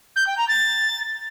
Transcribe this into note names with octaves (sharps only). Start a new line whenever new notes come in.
G6
G5
A#5
A6